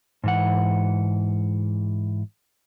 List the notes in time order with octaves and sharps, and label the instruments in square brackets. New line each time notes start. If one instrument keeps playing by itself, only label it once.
[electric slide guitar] G#2 E3 F#5